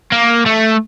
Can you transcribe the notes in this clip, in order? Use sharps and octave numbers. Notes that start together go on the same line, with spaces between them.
A#3
A3